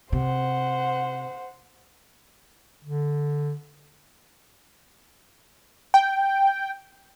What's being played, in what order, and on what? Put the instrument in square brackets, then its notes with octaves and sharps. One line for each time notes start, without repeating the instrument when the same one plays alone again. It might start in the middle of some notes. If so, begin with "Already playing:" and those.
[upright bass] C3 [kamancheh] C5 F#5
[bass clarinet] D3
[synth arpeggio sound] G5